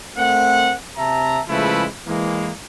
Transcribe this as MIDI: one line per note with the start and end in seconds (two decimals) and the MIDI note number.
0.17 0.73 57
0.17 0.73 60
0.17 0.73 70
0.17 0.73 78
0.97 1.40 48
0.97 1.40 76
0.97 1.40 81
0.97 1.40 82
1.49 1.85 49
1.49 1.85 53
1.49 1.85 56
1.49 1.85 57
1.49 1.85 64
1.49 1.85 71
2.08 2.50 52
2.08 2.50 56
2.08 2.50 58